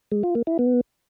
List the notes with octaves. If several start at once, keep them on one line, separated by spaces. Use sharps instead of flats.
G#3
F4
A#3
E4
B3